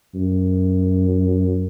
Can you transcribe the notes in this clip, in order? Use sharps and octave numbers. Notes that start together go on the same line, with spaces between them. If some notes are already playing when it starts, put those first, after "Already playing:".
F#2